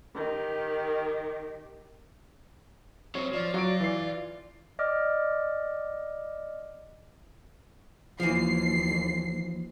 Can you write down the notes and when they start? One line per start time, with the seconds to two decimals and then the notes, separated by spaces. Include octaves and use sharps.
0.15 D#3 G4
3.15 F#3 C4 C#5
3.33 F3 D5
3.54 F#3 F4 C#6 D7
3.80 E3 C7
4.79 D5 D#5 D6 F6
8.20 D#2 E3 F3 C7